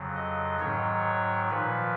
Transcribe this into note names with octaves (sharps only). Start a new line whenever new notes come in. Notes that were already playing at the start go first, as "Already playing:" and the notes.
Already playing: F2 C#3 F#3
D#5
G#2 D#3 F#3 C#5
A#2 F3 B4